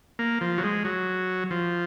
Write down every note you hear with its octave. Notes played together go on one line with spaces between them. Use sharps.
A#3
F3
F#3
G#3
F#3
F3